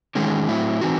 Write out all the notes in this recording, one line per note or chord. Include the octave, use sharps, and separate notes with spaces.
E2 D#3 G#3 C#4
A2 F#3 C4 E4
E3 C4 D#4 F#4